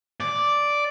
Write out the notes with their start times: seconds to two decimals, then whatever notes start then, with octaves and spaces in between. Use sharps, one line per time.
0.20 D5